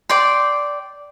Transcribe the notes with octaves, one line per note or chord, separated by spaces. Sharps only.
D5 G5 C6